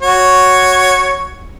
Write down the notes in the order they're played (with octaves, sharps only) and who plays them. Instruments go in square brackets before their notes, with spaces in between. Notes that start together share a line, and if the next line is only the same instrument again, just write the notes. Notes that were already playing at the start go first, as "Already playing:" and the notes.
[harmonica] F#4 C#5